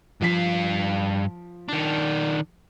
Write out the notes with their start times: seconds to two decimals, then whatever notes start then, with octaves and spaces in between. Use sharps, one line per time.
0.22 G2 F3 F5 B6
1.68 D#3 D4